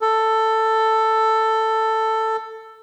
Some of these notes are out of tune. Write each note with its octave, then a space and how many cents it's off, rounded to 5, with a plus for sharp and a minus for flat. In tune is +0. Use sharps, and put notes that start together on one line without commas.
A4 +10